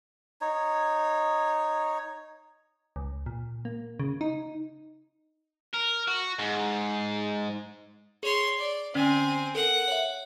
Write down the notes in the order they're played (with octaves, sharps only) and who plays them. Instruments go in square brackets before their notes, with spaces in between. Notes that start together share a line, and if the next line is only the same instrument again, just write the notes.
[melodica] D#4 C#5
[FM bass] C#2
A#2
A#3
C#3
D#4
[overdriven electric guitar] A#4
F#4
G#2
[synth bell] G#4 [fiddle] C#5 C6
[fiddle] D5
[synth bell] D3 C#4 D5 [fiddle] C4 G#5
[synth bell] A4 A#4 [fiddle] F#5
[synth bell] C#5 E5